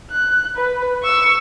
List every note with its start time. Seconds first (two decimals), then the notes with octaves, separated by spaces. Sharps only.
0.11 F#6
0.57 B4
1.03 C#6 E6